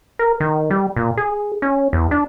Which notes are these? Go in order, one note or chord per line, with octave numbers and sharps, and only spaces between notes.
A#4
D#3
G3
A#2
G#4
C#4
E2
D4